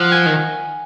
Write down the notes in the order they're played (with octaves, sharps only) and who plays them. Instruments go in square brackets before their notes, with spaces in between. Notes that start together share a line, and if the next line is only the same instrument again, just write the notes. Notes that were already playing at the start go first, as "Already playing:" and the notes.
Already playing: [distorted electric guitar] F3 [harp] F#5
[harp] G#5
[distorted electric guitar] D#3